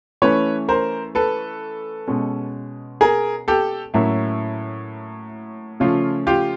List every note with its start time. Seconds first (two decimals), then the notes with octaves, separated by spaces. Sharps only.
0.22 E3 A3 C#4 B4 C#5
0.69 A#4 C5
1.15 A4 B4
2.08 B2 G#3 C#4
3.01 G#4 A#4
3.48 G4 A4
3.94 A2 F#3 A#3 C#4 E4
5.80 C#3 F3 A3 C#4 F4
6.27 F4 G4